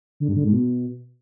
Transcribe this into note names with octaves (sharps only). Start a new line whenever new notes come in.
D3
G2
D3
G#2
B2